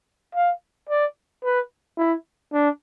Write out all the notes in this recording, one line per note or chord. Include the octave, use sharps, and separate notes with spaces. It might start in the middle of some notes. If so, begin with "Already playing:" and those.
F5
D5
B4
E4
D4